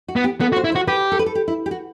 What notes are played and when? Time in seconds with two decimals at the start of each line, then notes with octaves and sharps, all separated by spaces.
0.08 F#4
0.16 B3
0.24 G4
0.40 B3 A4
0.53 F#4
0.56 C5
0.64 E4
0.72 C5
0.75 F#4
0.87 G4 B4
1.12 A4
1.19 B4
1.26 A4
1.35 G4
1.48 E4
1.66 G4
1.71 F#4